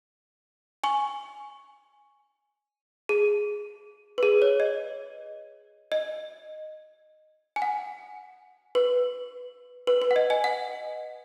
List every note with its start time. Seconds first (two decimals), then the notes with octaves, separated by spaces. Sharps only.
0.84 G#5 C#6
3.09 G#4
4.18 B4
4.23 G#4
4.42 C#5
4.60 D#5
5.92 D#5
7.56 G#5
7.62 F#5
8.75 B4
9.87 B4
10.02 B4
10.11 F#5
10.16 D#5
10.30 D#5 G#5
10.44 F#5